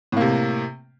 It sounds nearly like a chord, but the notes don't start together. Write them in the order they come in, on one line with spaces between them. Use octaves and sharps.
A2 A#3 C3